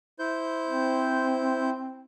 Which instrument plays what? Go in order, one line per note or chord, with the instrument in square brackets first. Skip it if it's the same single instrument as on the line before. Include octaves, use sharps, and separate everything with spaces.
[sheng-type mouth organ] E4 C5 G6
[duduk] C4